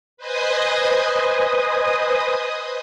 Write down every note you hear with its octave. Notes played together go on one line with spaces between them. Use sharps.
B4 C5 D#5 G#5 D#6